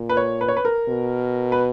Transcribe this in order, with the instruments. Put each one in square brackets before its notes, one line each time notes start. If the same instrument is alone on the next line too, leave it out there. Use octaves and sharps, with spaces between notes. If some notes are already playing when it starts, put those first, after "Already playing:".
Already playing: [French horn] A#2
[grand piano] B4
C#5
B4
C#5
B4
A#4
[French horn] B2
[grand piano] B4